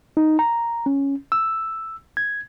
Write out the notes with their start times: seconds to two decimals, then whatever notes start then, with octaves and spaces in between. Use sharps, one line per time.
0.17 D#4
0.39 A#5
0.86 C#4
1.32 E6
2.17 G#6